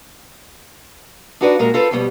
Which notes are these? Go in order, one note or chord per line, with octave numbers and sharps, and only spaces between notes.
D4 D#4 F#4 B4 C5 D5
A#2 G#3 F#4 A#4
F4 A4 B4 C5
F2 B2 G3 B3